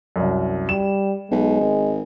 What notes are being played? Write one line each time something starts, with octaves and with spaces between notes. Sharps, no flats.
C2 F#2
G3 E7
B1 G#3
G#1